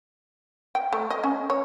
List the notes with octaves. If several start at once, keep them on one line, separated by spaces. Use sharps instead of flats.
G5
A3
D#5
C#4
C#5